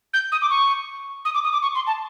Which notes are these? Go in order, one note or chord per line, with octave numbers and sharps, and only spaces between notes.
G6
D#6
D6
C#6
D#6
D6
D#6
D6
C#6
C6
A5